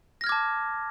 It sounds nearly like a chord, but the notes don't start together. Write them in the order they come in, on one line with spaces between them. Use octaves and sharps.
A#6 F6 G#6 D6 A5